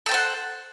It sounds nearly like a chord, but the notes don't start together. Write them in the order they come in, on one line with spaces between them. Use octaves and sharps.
A4 G5 C5 F#5